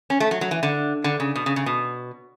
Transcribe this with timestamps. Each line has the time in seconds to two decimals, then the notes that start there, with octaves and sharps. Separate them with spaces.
0.10 C#4
0.20 A3
0.31 F#3
0.41 F#3
0.51 E3
0.63 D3
1.04 D3
1.20 C#3
1.35 B2
1.46 C#3
1.56 C#3
1.66 B2